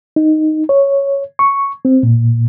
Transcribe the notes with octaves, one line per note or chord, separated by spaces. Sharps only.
D#4
C#5
C#6
C4
A#2